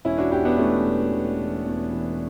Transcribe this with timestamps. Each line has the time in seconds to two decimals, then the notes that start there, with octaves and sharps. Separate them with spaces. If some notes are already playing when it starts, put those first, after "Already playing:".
0.05 E1 C#4 E4
0.18 D4 F#4
0.31 E2 E4 G4
0.45 B3 D4
0.58 E2 A3 C#4
0.85 E1
1.11 E1
1.39 E3
1.66 E2
1.92 E3